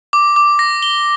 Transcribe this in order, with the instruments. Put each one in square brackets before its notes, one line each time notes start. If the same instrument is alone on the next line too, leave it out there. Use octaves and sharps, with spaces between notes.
[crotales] D6
D6
A#6
G7